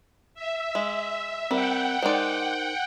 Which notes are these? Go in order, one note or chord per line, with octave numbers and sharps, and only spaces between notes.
E5
G#3
G3 C4 A#4 F#5 G5
G#3 D#4 A#4 C5 D5